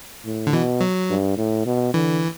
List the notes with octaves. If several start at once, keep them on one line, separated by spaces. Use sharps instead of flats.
A2
D3
B2 E3
F#3
G2
A2
B2
D3 E3